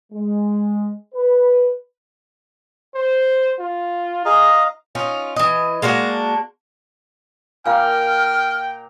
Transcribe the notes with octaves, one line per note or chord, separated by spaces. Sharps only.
G#3
B4
C5
F4
G#4 D#5 F5 A#5
C#4 D#4 F4
E3 D#5
G#3 A#3 D4 F#4
A#2 F4 A#4 F5 G5 G#5 D6 F6